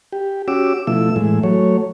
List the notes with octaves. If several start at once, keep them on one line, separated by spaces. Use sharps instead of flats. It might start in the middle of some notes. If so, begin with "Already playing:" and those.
G4
C#4 F#4 G4 D6 E6
B2 F3 A3 E4 E6
A2 E3 G#3
F#3 A3 C#5